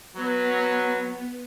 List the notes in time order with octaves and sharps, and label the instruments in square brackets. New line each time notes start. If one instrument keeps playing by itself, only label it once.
[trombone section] F#3 B4 [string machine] B3